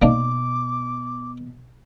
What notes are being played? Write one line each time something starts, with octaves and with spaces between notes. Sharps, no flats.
B2 A#3 D4 D#4 D6